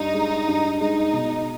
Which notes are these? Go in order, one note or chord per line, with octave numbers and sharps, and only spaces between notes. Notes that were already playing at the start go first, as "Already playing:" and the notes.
Already playing: G2 D#4
G#3
G2
G#3 D#4
B2